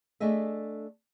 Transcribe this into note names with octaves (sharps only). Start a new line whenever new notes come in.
A3 D4 G#4 D#5 E5